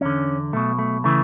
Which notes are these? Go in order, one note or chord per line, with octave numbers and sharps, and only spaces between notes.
E2 D3 C#4
B1 B2 A3
A3
C#3 E3 A3